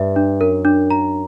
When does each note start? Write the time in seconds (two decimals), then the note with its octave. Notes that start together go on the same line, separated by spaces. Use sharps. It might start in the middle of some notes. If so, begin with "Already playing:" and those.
Already playing: G2 E5
0.16 D4
0.41 F#2 A#4
0.65 D4
0.91 A#5